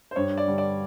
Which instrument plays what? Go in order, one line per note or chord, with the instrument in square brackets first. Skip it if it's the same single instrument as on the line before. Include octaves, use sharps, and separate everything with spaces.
[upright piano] C5
[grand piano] G2 [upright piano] C#5
[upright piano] D5
[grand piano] D3 G3
[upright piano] D5